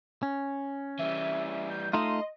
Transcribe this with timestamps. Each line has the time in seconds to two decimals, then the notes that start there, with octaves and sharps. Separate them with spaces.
0.23 C#4
0.99 E3 G3 E5
1.70 G6
1.93 A3 D#4 F4 D#5 C6